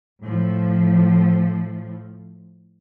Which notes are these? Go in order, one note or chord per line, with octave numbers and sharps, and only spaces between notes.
A2 F3